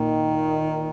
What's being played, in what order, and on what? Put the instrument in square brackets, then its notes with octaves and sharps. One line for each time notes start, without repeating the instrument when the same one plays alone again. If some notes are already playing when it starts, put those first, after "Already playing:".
Already playing: [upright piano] A#2 [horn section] D#3